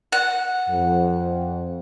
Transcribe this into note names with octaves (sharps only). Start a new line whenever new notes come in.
F#5
F2